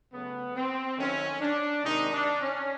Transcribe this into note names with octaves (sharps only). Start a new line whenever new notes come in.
C#3 F#3 A3 B3
C4
D#3 F#3 A3 C#4
D4
C3 D#3 G#3 D#4
D4
C#4